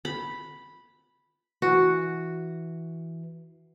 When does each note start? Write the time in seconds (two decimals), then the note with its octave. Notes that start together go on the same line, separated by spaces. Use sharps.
0.05 B5
1.62 E3 F#4